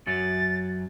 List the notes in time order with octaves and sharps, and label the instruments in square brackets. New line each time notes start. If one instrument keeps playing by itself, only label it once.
[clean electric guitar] F#2 F#3 [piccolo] A6